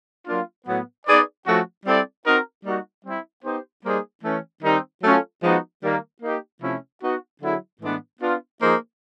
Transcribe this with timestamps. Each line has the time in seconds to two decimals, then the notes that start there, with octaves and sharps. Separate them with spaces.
0.26 F#3 A#3 D4 F4
0.67 A2 F#3 B3
1.06 B3 D#4 G#4 B4 D5
1.46 F3 A3 C#4 F#4
1.86 G3 C4 E4 A4 D5
2.25 C4 D#4 F#4 A#4
2.65 G3 A#3 D#4 F#4
3.05 G3 C4 E4
3.44 B3 D#4 G4 C5
3.84 G3 A#3 D#4 G#4 C5
4.24 E3 A3 C#4
4.63 D#3 G3 C4 D#4
5.03 F#3 A3 C#4 F4 A4
5.43 F3 G#3 B3 D#4 F#4
5.83 D#3 G3 A#3
6.22 A#3 D#4 G4
6.62 C3 F3 A3 C#4 E4
7.02 B3 D#4 F#4
7.41 D3 F#3 B3 E4 G#4
7.81 A2 E3 G#3 B3 D4
8.21 B3 D4 F4
8.61 F3 A#3 D#4 G#4 C5